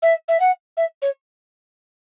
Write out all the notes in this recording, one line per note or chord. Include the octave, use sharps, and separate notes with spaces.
E5
E5
F#5
E5
C#5